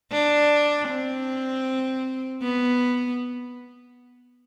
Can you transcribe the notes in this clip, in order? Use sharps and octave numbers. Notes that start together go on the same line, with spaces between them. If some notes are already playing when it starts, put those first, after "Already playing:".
D4
C4
B3